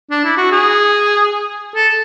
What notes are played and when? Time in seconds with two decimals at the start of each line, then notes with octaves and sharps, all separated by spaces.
0.10 D4
0.24 E4
0.38 F#4
0.52 G#4
1.75 A4